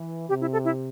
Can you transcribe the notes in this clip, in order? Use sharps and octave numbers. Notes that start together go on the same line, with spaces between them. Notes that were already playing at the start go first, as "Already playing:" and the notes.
Already playing: E3
C3 G4
E4
A4
E4